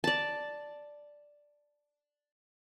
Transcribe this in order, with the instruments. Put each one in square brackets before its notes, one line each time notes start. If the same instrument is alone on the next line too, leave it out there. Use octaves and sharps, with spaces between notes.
[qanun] D5 A5